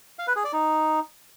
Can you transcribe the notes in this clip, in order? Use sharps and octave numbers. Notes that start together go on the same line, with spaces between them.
F5
B4
G#4
D5
D#4